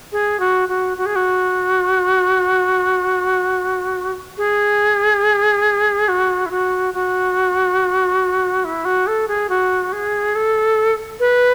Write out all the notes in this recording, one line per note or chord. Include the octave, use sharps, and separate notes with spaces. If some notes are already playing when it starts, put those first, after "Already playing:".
G#4
F#4
F#4
F#4
G#4
F#4
G#4
F#4
E4
F#4
F#4
E4
F#4
A4
G#4
F#4
G#4
A4
B4